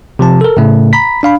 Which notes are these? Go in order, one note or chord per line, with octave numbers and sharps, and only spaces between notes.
C3 F3 A5
A4 A#4
A2 C#3 A3
A#5 B5 B6
D4 F5 B5